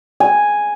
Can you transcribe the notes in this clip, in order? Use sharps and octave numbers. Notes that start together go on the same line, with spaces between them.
G#5